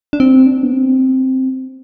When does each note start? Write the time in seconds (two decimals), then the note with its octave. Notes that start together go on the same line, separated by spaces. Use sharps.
0.13 D4
0.20 C4
0.46 D4
0.63 B3
0.73 C4